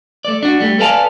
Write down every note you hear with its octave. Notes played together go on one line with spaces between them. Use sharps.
A3 D5
D4 F#4
G3 A3
A4 B4 D5 F5 G#5 A5